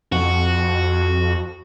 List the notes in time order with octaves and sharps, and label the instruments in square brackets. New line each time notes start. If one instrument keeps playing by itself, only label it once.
[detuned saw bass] F2 [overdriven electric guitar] F#4